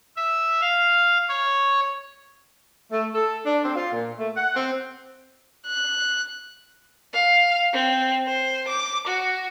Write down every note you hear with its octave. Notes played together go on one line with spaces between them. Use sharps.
E5
F5
C#5
A3
A4
D4
C4
F4
A#2
A3
F#5
C4
F#6
F5
C4
C5
D6
F#4